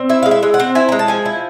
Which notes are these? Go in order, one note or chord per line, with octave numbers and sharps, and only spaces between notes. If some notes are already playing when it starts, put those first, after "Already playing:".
Already playing: C4
E4 E5
G#3 F5
E5
G#3
F#5
C4
E4 G#5
G#3 A#5
A5
F3 G#5
E4